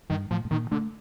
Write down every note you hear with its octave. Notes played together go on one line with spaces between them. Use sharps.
G2 D#3
A2 F3
A2
A#2 D#3
D3 A3